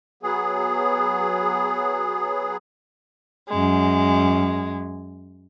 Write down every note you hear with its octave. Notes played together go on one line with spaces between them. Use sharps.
F#3 B3 G#4
F#2 G#3